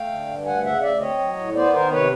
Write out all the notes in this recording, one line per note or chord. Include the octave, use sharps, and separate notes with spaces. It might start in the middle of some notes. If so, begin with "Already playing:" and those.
Already playing: A3 F5 G5
D3
G2
D2 F#5 G#5
C#3 E5 F#5
D2 D5 E5
C4 C#5 D#5
F#3
A2
B3 C5 D5
D#3 A#4 C5
C3 B4 C#5